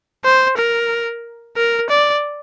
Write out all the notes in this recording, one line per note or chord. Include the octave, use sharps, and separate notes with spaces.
C5
A#4
A#4
D5